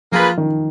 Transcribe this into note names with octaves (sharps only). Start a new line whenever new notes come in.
F3 A#3 F4 G#4 B4
D#3